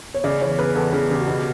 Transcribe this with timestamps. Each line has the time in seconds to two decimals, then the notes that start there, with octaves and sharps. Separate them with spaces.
0.14 C#5
0.24 C#3 D5
0.41 E3 C#5
0.58 C#3 B4
0.75 E2 A4
0.93 C#3 G#4
1.10 C#3 G4
1.20 F#4
1.27 B2 G4